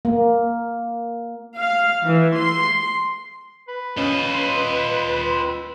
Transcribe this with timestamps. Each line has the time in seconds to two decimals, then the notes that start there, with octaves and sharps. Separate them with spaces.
0.05 A#3
1.58 F5
2.05 E3
2.39 C6
3.68 B4
3.97 C#4 F4 D#5
4.34 C6